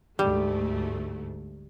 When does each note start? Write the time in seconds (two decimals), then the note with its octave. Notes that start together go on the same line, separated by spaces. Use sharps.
0.19 D2 G#2 G3 A3